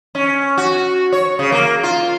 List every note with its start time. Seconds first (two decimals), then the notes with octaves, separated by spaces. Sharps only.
0.15 C#4
0.57 F#4
1.12 C#5
1.39 C#3
1.52 A#3
1.83 F4